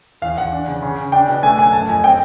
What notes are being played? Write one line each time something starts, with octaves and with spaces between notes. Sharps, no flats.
E2 F5
E2 F#5
D4
C#3
C#3
C#3
D4 G5
B2
A3 G#5
F#2 G#5
A3 A5
F2 G#5
C4 G5